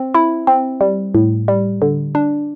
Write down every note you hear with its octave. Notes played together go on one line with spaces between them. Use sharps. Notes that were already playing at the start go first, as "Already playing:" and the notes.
Already playing: C4
E4
C4
G3
A2
G3
D3
D4